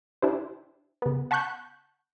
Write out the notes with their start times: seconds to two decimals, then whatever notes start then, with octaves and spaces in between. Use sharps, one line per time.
0.22 D4 E4 G4 C5
1.02 C#3 B3
1.31 F#5 A5 B5 C#6 F#6 G6